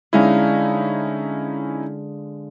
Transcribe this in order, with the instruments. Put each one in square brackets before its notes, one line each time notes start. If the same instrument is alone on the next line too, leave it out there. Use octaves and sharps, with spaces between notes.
[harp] D3 G#3 F5 [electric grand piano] C#4 D#4 E4